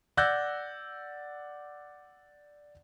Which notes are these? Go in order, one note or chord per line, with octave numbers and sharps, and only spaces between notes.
D5 F#5 E6 F#6 G6 A#6